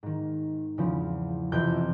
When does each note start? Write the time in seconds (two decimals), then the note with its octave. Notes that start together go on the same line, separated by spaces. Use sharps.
0.03 G#2 D#3
0.78 E2 C#3 F3
1.52 F2 C3 E3 G6